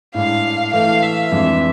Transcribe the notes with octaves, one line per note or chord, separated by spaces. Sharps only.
A2 G#3 D4 F5
E3 A3 E4 A4 F5
E5
F2 E3 G#3 D4